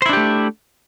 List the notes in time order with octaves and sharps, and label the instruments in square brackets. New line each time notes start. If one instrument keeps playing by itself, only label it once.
[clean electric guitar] C5
E4
D4
G4
A3